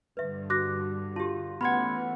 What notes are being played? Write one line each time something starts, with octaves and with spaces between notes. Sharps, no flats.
G2 D3 B4 E5
F#4 D6 F#6 A#6
F4 G4 A5
E3 A3 B3 C#4 F#5 B5 C6 G#6